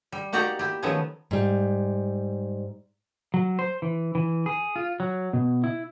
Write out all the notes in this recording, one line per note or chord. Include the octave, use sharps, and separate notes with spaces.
G3
A#3 D#4 F#4 G4 D5 A#5
E4 G4
D#3 F3 F#3 A3 B3 C#4
G#2 G3
F#3
C5
E3
E3
G#4
F4
F#3
B2
E4